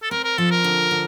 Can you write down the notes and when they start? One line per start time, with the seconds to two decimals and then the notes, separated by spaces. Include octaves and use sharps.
0.03 A4
0.11 C4 A#4
0.24 A#4
0.38 F3 A4
0.51 A#4
0.64 D3
0.91 D3